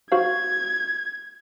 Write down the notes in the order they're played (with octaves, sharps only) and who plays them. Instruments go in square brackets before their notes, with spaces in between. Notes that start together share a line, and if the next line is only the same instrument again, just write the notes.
[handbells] F#4 C5 F5 [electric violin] G#6